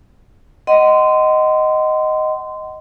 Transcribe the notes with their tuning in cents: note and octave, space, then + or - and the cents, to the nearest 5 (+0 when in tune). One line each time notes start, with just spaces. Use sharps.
D#5 +0 F#5 +25 C6 -20